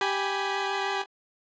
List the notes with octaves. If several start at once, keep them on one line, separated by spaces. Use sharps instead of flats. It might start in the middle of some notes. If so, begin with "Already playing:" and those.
G4 G#5 B5